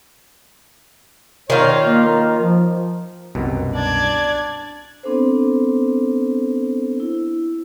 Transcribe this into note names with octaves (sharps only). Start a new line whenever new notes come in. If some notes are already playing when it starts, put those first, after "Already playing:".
D#3 F4 C#5
A#3
A#4
F3
C2 F#2 B2
D4 D5 G#6
B3 C4 D4 A4 C5
E4